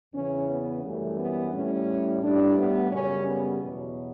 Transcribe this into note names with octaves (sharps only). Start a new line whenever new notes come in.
E2 C#3 E3 C#4
B3
F#2 E3 G3 A3
B3
A2 G3 C#4
A2 G3 D4
B3
F#2 C#3 G3 C#4
B3
E2 B2 F#3